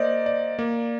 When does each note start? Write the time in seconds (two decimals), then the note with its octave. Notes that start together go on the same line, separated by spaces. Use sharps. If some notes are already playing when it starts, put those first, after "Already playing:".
Already playing: A#3 C5 D5 D#5
0.26 D5
0.59 A#3